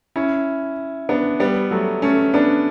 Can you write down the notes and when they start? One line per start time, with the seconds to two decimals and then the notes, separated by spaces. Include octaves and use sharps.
0.16 C#4 E4
1.09 B3 D4
1.40 G3 B3
1.71 F#3 A3
2.02 A3 C#4
2.34 B3 D4